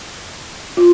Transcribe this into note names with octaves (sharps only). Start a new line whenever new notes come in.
F4